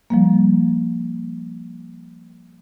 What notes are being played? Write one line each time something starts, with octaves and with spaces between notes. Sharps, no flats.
F3 G3 A#3